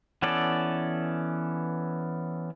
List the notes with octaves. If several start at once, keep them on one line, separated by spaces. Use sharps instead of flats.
E3 B3 C#4 A4 D5